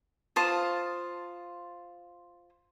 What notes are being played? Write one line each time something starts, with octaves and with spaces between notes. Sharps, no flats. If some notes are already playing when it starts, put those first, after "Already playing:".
F4 C5 A5 D#6